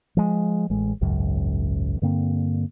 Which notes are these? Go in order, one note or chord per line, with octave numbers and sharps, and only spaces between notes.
F3 G#3
A1 G#3
G#1 C#2 F#2
G2 D3 A#3 C4